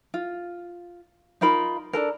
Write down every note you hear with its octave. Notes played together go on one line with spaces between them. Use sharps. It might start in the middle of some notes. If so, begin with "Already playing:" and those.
F4
D#4 F4 A#4 B5
D4 A4 A#4